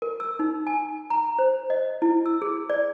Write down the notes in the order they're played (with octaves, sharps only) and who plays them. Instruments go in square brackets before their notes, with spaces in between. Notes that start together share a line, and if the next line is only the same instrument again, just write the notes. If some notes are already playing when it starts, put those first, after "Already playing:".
[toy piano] A#4
E6
D#4
G#5
A#5
C5
D#5
E4
E6
G#4
D5